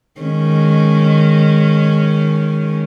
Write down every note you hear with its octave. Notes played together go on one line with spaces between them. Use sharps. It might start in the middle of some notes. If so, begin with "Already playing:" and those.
D#3 G#3 C#4